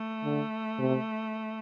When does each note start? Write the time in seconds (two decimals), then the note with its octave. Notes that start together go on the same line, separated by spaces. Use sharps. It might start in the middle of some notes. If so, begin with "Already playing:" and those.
Already playing: A3
0.24 D3
0.79 C3